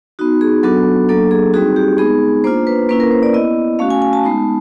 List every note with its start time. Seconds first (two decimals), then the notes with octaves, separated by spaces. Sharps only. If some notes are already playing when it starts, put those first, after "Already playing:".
0.19 B3 D#4 F#4
0.41 G#4
0.63 F#3 B3 D4 F#4 A4
1.09 F#3 A#3 D4 A4
1.31 G#4
1.53 G3 C4 D#4 F#4 G#4
1.76 G4
1.98 G#3 B3 D#4 G#4
2.44 A#3 D4 F4 C5
2.67 B4
2.89 A#3 C#4 E4 B4
3.00 A#4
3.11 C5
3.23 D5
3.34 B3 E4 D#5
3.79 A3 C#4 F#4 F5
3.90 G#5
4.02 G#5
4.13 A5
4.24 G#3 B3 D#4